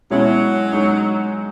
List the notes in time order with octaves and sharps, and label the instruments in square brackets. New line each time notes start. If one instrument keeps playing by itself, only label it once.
[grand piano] B2 G#3 C#4 E4 [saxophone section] F#3
[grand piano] G#3 D#4